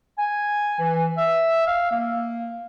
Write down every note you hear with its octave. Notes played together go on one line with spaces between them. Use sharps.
G#5
E3
E5
F5
A#3